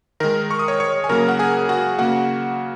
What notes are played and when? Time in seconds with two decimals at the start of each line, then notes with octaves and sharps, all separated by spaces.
0.20 D#3 G#3 A#4 A#5
0.51 C#6
0.59 D#6
0.68 C#5 C#6
0.80 C#5 C#6
1.04 G#5
1.09 C#3 F#3 A#3 A#4 A#5
1.28 F#5
1.39 G#4 G#5
1.69 F#4 F#5
1.99 C#3 A#3 F#4 F#5